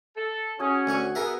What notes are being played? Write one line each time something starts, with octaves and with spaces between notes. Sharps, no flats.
A4
C#4 F#4 G#4 G#5
D2 F#5 G#5 C#6
B3 G#4 A#4 E5